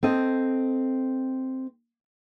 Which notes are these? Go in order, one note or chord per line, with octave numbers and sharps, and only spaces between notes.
C4 A4 D#5